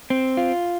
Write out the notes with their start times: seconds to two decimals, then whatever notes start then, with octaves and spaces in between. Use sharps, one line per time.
0.10 C4
0.37 F4